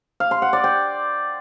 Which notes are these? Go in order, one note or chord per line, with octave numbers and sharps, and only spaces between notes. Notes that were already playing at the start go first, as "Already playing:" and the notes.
F5
C6
F#5
D5
G5